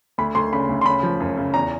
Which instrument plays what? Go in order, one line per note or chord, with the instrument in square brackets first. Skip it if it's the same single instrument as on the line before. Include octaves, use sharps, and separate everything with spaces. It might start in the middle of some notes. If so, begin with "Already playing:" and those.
[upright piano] D2 B5
D2 C6
C#3 B5
D2
C6
C#3 B5
F3
F#2
C#3
E2 A#5